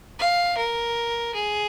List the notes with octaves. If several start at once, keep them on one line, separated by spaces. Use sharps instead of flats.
F5
A#4
G#4